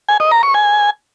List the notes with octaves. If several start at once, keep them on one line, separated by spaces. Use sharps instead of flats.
G#5
D#5
A#5
C#6
G#5